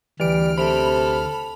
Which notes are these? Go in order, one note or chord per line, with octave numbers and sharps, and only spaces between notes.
D2 E3 G3 F6 D7
C3 A4 B5 F7